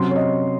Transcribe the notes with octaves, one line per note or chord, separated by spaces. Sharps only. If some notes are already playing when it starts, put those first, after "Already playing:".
Already playing: C3 F#3 C#4 C6
C#5
D#5